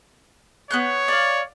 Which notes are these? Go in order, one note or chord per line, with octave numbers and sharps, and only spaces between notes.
B3 C#5 F#6 G6
D5 F5